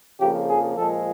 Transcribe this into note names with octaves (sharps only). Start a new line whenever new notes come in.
F2 C#3 F3 A#3 G4
G#4
A#2 F3 G#3 A4